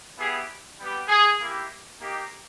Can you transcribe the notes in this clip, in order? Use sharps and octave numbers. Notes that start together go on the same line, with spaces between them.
B3 E4 G4 G#4
G3 B3 G4
G#4
A#3 E4 G4
A#3 D#4 G4